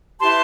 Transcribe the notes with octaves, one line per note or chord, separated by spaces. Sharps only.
E4 G4 B4 A5 C6